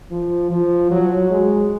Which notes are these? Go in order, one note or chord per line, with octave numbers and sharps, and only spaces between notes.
F3
F3
F#3
G#3